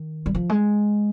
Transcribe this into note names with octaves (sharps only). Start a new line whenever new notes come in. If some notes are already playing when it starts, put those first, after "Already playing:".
Already playing: D#3
G3
F3
G#3